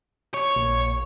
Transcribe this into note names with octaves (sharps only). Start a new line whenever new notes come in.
C#5
A#1